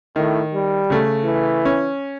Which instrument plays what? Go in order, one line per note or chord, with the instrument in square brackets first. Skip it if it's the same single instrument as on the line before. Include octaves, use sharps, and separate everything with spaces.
[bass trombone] A2 [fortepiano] D#3
[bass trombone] G3
[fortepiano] C#3 A3
[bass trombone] E3
[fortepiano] C#4